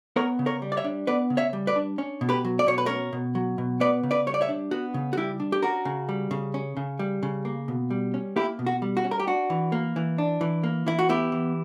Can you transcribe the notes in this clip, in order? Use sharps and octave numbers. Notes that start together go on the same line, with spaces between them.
B3 A#4 C#5
C#3
A#4 C#5
G3
D5
C#5 E5
D4
B3 B4 D5
C#3
C#5 E5
G3
B4 D5
D4
C#4
B2
G4 B4
F#3
D5
B2 C#5
B4
C#4 A#4 C#5
B2
F#3
B2
B3 B4 D5
C#3
B4 D5
G3 C#5
D5
C#5 E5
D4
B3 F#4
C#3
F#4
G3 E4 G4
D4
G4
C#4 F#4 A#4
C#3
G3
C#3
C#4
C#3
G3
C#3
A#3
B2
G3
C#4
A#3 E4 G4
B2
F#4
G3
F#4
C#4
A#4
G4
D4 F#4
E3
A#3
E3
D4
E3
A#3
E3 E4
F#4
B3 E4 G4
E3